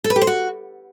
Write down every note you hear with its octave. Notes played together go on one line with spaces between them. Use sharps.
A4
B4
G4
C5
F#4